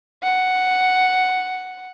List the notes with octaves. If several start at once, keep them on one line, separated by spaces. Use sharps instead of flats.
F#5